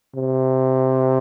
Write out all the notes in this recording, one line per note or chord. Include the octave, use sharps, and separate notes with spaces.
C3